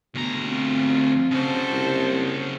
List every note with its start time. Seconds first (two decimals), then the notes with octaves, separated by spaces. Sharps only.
0.15 D2 B2 A#5
0.48 C4 F4
1.31 C#3 F#4 A4 C5
1.71 C2